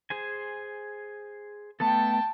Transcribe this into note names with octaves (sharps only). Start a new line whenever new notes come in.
G#4 C5 G#5
A3 B3 A4 G5 A5